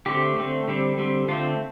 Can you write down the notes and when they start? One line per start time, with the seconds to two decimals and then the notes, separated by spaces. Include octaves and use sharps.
0.06 D3 A3 C4 G4
0.36 D3 A3 C4
0.68 D3 G3 C4
0.98 D3 G3 C4
1.28 D3 A3 C4 F4